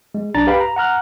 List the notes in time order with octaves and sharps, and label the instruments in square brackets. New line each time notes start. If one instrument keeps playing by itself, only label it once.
[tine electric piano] G#3
B1 D4 A#5 A6
G4 B4 F5 G5 B5
A#5
F#5 A#5 F6 F#6